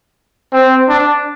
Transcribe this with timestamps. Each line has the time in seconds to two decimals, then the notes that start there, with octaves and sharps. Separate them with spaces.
0.53 C4
0.88 D4